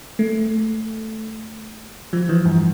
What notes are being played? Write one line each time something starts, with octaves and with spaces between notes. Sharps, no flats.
A3
F3
E3
G2